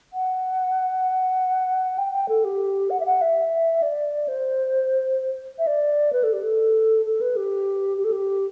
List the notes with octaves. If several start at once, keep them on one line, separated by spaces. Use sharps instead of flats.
F#5
G5
G5
A4
G4
F#5
E5
F#5
E5
D5
C5
E5
D5
B4
A4
G4
A4
A4
B4
G4
G4
A4
G4